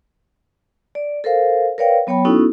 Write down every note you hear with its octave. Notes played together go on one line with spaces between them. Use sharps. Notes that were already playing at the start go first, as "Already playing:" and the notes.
D5
A4 A#4 C5 F5
A#4 B4 C#5 D5 F5 G5
F#3 B3 C#5 G5 B5
B3 C#4 D#4 E4 F#4 A4